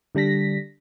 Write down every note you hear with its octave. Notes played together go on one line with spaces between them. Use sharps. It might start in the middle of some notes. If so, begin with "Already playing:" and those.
D3 G3 D4 A#6 B6